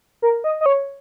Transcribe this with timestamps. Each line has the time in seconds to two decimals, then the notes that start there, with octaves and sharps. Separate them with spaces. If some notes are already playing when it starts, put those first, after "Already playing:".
0.22 A#4
0.44 D#5
0.61 D#5
0.66 C#5